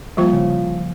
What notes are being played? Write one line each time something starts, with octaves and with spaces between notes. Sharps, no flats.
F3 G3 A#3 F4 C5
C#3